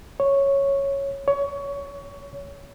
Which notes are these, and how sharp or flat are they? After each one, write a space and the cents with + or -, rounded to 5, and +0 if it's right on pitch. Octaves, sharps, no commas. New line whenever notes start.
C#5 -5
C#5 +20